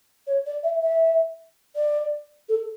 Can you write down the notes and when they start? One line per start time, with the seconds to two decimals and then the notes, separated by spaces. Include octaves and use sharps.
0.26 C#5
0.45 D5
0.63 E5
0.82 E5
1.75 D5
2.48 A4